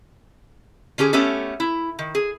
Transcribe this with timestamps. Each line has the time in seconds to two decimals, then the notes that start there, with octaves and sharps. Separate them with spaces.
0.98 D3 C#4 G4 G#4
1.13 A3 B3 C#4 G4 A4
1.60 E4
1.99 D#3
2.15 G#4